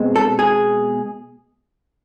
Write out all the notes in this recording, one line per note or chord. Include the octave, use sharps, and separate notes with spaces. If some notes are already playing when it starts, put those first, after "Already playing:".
Already playing: B2 G#3 C4
A4
G#4